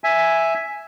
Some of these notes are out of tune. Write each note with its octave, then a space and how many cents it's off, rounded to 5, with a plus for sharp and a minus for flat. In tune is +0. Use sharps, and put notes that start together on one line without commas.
E5 +0 G#5 +0